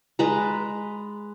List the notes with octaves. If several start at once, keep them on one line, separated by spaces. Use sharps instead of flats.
G#3 B4 A5 A#5